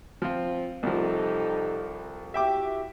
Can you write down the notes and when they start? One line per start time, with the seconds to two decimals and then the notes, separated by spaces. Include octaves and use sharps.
0.22 F3 C4 F4
0.83 C2 F3 D#4 G4 A4
2.34 E4 F#4 G4 E5 G5 D6